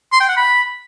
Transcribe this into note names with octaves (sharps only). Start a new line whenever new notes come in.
C6
G5
F#5
B5